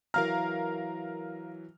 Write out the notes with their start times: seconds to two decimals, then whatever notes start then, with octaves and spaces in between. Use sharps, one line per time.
0.14 E3 F#3 A#4 F5 A#5 F6